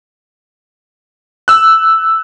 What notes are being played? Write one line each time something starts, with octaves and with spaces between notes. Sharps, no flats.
E6 F#6